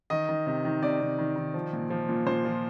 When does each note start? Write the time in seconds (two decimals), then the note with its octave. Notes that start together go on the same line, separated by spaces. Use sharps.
0.10 D#3 D#5
0.29 D#3
0.47 C3
0.65 D#3
0.82 C3 D5
1.01 C3
1.19 D#3
1.36 D#3
1.54 F3
1.73 A#2
1.90 F3
2.09 A#2
2.26 A#2 C5
2.45 F3